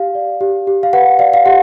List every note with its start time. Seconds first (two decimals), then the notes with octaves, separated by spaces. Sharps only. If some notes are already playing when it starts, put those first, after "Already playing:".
Already playing: G4 F5
0.15 D5
0.41 G4
0.67 G4
0.83 F5
0.93 B4 F#5
1.19 D5 F5
1.34 F5
1.45 G4 F#5